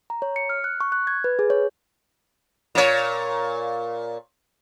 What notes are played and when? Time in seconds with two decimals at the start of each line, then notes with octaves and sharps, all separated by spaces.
0.10 A#5
0.22 C#5
0.36 C#7
0.50 F6
0.64 F#6
0.80 C#6
0.92 F#6
1.07 G#6
1.24 B4
1.39 G#4
1.50 C#5
2.75 A#2 C#5